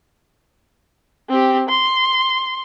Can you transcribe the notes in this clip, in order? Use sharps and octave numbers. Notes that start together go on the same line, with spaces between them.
C4 G4
C6